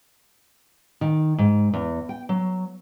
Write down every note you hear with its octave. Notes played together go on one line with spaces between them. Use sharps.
D#3
G#2
E2
G5
F#3